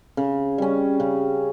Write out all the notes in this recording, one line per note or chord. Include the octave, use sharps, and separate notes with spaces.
C#3
G3 C#4
C#3